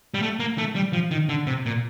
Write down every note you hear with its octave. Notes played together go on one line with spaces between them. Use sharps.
G3
A3
A#3
A3
G3
F3
D#3
D3
C3
A#2